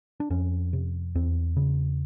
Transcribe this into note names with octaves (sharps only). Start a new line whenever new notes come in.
D4
F2 C#4
C3
E2 C4
C#3